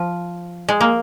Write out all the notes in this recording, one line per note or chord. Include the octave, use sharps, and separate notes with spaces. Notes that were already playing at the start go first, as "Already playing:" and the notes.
Already playing: F3
G#3
A#3